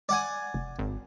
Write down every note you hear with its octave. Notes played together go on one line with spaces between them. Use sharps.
D5 F#5 G#5
F1
G#1